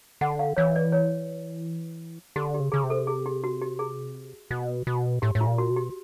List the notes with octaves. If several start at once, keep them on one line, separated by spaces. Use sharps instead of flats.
D3 F#5
F5
E3 C#5
D5
C#5
D3 G4
G4
C#3
C#3 G#4
C3
A4
G#4
G4
F#4
G4
G#4
B2
B2
A2 G4
A2
F4
A#2
F#4
B2
G4